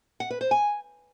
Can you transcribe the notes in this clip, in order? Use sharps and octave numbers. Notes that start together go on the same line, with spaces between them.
F#5
B4
C5
G#5